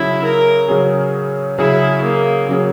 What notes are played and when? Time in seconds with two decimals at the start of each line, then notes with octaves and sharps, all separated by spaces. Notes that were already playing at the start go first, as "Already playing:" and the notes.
Already playing: C#3 F#3 C#4 E4 G#4
0.24 A#4
0.68 C#3 F#3 C#4 G#4
1.58 C#3 F#3 C#4 E4 G#4
2.03 A#3
2.49 C#3 F#3 C#4 G#4